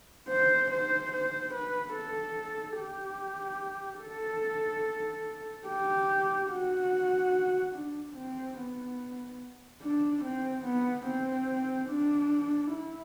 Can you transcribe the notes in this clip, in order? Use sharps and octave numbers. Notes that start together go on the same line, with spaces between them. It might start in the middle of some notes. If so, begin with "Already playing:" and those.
C5
C5
C5
B4
A4
G4
A4
G4
F#4
D4
C4
B3
D4
C4
B3
C4
D4
E4